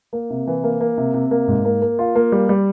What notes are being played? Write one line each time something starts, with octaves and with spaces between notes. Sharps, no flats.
A#3
C3
E3
A#3
A#3
C3
C3
A#3
G#2
A#3
A#3
F4
A#3
G3
G3